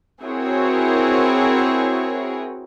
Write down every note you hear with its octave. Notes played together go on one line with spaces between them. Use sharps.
C4 E4 F#4 G#4 A#4 C#5